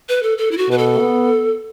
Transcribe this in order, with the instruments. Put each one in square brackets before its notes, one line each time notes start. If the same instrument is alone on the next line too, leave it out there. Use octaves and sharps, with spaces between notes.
[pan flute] B4
A4
A4
E4
F#4
[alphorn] B2 [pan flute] B4
[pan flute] A4
[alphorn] B3